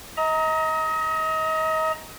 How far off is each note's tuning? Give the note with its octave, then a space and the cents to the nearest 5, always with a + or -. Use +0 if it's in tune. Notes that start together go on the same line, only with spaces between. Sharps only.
D#5 +35 A#5 +0